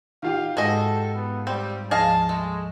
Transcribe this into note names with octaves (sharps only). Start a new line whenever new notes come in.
D#3 F4 G4 F5
G#2 G#3 F#4 G#4 A4 D#5 E5
B3
G3 C4
D2 F3 G#4 D#5 F5 A5
G#3 A3